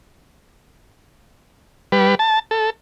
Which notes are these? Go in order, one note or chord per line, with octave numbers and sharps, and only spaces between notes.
G3 B4
A5
A4